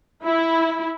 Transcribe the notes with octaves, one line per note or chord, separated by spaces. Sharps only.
E4